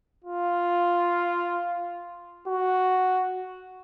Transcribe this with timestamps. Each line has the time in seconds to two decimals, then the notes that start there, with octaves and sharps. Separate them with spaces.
0.24 F4
2.48 F#4